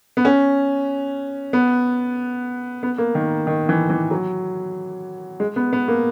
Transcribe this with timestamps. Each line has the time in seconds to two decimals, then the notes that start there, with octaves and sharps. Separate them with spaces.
0.17 B3
0.25 C#4
1.53 B3
2.83 B3
2.98 A#3
3.15 D#3
3.47 D#3
3.69 E3
3.90 E3
4.11 F#3
5.40 G#3
5.56 B3
5.73 B3
5.88 A#3